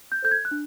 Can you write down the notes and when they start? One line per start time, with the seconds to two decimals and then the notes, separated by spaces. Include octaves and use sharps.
0.12 G6
0.22 A4 C5 G6
0.31 G#6
0.45 F#6
0.51 D4